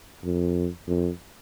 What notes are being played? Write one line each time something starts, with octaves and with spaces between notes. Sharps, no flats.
F2
F2